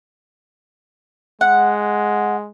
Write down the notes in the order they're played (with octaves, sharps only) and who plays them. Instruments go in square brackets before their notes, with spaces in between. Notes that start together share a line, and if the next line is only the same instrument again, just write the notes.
[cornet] G#3 [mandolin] F#5